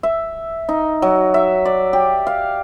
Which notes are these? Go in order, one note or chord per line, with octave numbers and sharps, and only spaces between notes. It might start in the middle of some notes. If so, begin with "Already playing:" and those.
E5
D#4
F#3
E5
D5
G4
F5